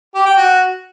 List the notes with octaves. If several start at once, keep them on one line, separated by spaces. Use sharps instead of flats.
G4
G5
F#4